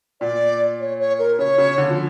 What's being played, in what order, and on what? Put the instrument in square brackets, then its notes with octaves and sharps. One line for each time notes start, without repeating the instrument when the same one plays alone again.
[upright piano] A#2 [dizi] D5
[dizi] C#5
C#5
A#4
[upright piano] C#3 [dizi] C#5
[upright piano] C#3
D3
F3